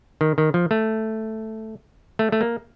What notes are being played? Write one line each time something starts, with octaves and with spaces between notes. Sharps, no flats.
D#3
D#3
F3
A3
A3
A3
A#3